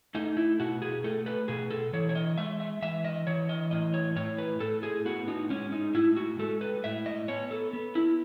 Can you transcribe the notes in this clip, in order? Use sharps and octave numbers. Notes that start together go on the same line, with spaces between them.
A3 D#4
E4
B2 F#4
G#4
A3 A4
B4
B2 G#4
A4
E3 C#5
C#5
D#5
G#3 E5
E5
E3 E5
D#5
E3 C#5
D#5
A2 D#5
C#5
A2 C#5
B4
A2 A4
G#4
B3 F#4
D#4
G#3 C#4
D#4
A2 E4
F#4
G#3 A4
B4
A2 E5
D#5
B3 C#5
A4
B3
E4